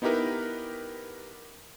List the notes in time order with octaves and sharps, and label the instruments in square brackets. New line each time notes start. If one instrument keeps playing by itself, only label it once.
[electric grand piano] B3 D#4 E4 G4 A#4 B4